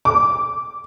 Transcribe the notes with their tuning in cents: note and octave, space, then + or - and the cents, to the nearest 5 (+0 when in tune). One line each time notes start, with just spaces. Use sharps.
D6 -10